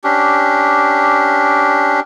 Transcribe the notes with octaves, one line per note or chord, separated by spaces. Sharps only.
C#4 D4 G4